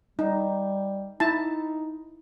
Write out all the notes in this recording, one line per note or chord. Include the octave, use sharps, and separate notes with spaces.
G3 D#4
D#4 E4 A5